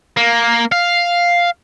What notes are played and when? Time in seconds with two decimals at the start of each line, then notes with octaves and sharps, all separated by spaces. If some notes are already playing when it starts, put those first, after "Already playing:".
0.17 A#3
0.72 F5